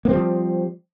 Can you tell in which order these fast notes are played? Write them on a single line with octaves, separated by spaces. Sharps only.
A#3 C4 G3 F3